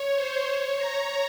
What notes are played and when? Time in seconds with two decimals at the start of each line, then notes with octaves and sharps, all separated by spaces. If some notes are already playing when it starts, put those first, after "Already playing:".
Already playing: C#5
0.14 C5
0.46 C#5
0.77 A#5